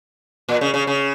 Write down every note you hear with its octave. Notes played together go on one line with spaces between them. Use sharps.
A#2
C#3
C#3
C#3